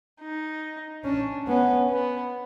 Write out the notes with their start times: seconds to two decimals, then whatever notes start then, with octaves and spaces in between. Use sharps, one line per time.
0.20 D#4
1.04 C#4 D4
1.48 B3 C#4
1.90 B3